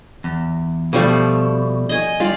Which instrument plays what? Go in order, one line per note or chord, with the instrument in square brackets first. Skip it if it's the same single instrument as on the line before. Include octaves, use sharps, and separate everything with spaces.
[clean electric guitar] E2
[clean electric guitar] B2 [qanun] F3 G3 A3
[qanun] D#5 G#5
[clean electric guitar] G3 [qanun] F4 D5